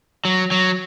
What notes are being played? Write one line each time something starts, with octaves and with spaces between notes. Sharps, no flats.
F#3
F#3